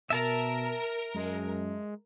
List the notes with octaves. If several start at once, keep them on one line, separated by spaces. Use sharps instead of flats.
B2 A#4 E5 A5 A#5
F#2 G#3